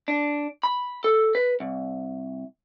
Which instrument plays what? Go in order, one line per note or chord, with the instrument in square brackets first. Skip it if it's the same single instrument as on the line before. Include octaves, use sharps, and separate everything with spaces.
[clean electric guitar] D4
B5
A4
B4
C2